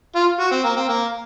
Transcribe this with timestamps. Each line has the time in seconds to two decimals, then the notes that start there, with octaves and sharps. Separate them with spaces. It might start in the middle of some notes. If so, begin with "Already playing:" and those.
0.15 F4
0.40 F#4
0.51 C4
0.64 A#3
0.76 C4
0.89 A#3